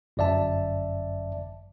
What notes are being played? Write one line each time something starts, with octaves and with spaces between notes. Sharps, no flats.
G1 F#2 D5 E5 A5